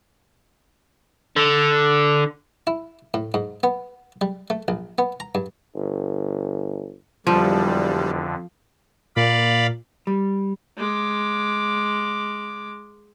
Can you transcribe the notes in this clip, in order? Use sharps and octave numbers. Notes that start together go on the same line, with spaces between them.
D3
E4
A2
G#2
B3
G3
A3
A#1
B3
A#5
G2
G1
E1 F2 D3 F3 G3
A#2 D5 F5 B5
G3
G#3 D6